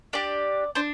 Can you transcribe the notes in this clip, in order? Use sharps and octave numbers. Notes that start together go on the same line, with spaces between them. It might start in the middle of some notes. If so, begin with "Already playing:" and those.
D4 G4 D5
D4 C5